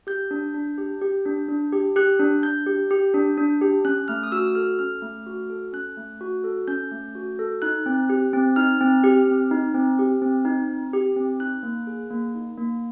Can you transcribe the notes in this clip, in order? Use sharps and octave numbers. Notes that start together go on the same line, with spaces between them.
G4 G6
D4
D4
G4
G4
D4
D4
G4
G4 F#6
D4
D4 G6
G4
G4
D4
D4
G4
C#4 F#6
A3 F6
D#6
F#4 E6
A4 F6
C#4 F6
A3
F#4
A4
C#4 F#6
A3
F#4
A4
C#4 G6
A3
F#4
A4
D#4 F#6
C4
G4
C4
D#4 F6
C4
G4
C4
D#4
C4
G4
C4
D#4
C4
G4
C4
D#4 F#6
A#3
G#4
A#3
D#4
A#3